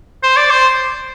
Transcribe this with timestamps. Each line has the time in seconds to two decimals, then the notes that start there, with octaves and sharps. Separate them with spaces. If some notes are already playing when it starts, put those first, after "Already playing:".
0.23 C5
0.37 D5
0.50 C5